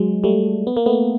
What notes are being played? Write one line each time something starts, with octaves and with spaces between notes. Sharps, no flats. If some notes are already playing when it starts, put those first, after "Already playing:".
Already playing: F#3 G#3
G3 A3
B3
A#3
A3 B3